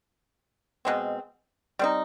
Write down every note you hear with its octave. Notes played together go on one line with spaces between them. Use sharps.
B2 G#3 C4
G3 C4 D#4